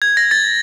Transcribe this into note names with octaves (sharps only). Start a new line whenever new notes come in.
G#6
A#6
A6